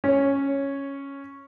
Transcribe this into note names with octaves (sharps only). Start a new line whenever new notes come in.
C#4 C#5